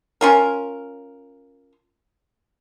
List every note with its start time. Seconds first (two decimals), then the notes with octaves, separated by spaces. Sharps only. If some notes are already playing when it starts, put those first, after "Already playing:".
0.21 C#4 F4 A#4